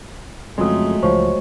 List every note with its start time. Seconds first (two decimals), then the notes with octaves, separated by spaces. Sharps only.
0.58 F2 C#3 F#3 G#3 A3 C6 D#6
1.03 C#2 F3 C5 C#5 C#6